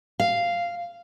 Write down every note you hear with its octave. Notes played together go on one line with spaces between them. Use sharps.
F5